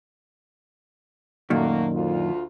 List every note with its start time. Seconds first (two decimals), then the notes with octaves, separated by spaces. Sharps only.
1.50 F#2 A#2 D#3 A3 A#3 F#4
1.93 D2 F4